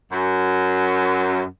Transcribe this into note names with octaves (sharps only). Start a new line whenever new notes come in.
F#2